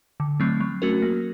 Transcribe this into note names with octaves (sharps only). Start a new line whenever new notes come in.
D3
F#3 A3 C4
F#3
A3 C#4 F#4 A#4
A#3